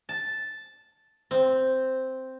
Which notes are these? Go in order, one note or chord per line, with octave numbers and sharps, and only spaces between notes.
A5
C4